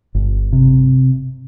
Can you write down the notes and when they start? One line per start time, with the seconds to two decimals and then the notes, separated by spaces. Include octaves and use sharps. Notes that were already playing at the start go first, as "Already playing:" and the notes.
0.15 G1
0.53 C3